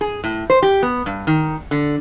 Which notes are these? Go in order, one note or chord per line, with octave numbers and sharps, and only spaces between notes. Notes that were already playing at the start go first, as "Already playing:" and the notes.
G#4
A2
C5
G4
B3
G2
D#3
D3